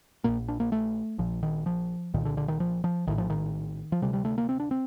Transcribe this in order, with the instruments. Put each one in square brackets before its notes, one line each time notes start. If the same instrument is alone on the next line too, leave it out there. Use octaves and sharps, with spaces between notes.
[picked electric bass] A#1 A#2 A#3
D4
A#3
A3
A#1 A#2 F3
D#3
F3
C2 A#2 D#3
D3
D3
D#3
F3
F3
A#1 A2 D#3
F3
D#3
F3
D2 C3 G3
G3
A3
A#3
C4
D4
C4